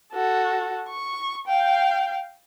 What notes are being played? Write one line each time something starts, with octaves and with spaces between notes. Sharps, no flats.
F#4 A4
C#6
F5 G5